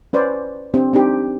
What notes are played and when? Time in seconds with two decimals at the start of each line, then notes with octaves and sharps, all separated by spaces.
0.13 C#4 B4 C5 D5
0.74 C4 D4 G4
0.93 C4 D4 D#4 G4